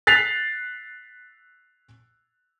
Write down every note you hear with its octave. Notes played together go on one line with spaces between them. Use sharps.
F#6 A6 B6 C7 F7